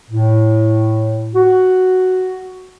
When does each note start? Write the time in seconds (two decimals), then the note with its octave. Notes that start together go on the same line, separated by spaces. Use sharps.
0.10 A2
1.34 F#4